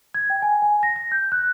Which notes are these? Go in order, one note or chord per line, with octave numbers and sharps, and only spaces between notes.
G#6
G5
G#5
G#5
A#6
A#6
G6
F#6